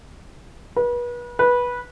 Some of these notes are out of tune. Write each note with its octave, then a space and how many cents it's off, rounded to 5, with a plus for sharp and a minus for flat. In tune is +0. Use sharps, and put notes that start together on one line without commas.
B4 -35
B4 -15